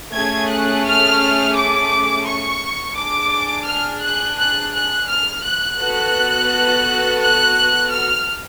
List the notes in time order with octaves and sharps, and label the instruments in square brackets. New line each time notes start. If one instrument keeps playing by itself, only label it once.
[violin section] A3 C#4 G#4 G#6
F#6
F6
D6
C#6
D4 G#4 D6
F6
F#6
F#6
F#6
F6
F#6
B3 F#4 A4
F#6
F6